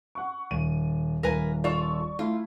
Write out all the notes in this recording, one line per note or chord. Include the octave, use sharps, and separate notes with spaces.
F#5 C#6
D#1 D#7
D#1 A#4 B4 G#5
F4 A4 D5 C#6
A3 E4 F4